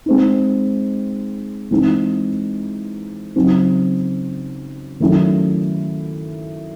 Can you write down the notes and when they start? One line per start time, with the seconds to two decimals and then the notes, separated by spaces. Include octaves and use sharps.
0.06 G#3 C4 D#4
1.71 E3 G#3 C4 D#4
3.36 C#3 F#3 C4 D#4
5.00 D#3 F#3 A3 C#4 E4